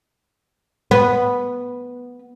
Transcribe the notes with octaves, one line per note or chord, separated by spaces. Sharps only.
B3